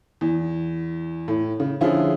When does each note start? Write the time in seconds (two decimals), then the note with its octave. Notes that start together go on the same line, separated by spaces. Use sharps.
0.21 E2
1.28 A2
1.60 C#3
1.81 D3 F3 C#4 E4 F4 G#4